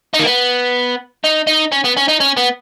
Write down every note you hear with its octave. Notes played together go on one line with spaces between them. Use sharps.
D#4
A#3
B3
D#4
D#4
C#4
B3
C#4
D#4
C#4
B3